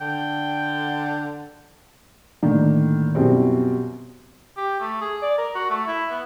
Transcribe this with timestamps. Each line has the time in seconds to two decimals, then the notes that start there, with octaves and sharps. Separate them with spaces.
0.01 D3 G5
2.43 A2 D3 D#3 A#3
3.15 F#2 B2 G3 C4 E4
4.57 G4
4.80 A3
5.01 G#4
5.22 D5
5.38 A#4
5.55 F#4
5.70 A3
5.87 E4
6.11 B3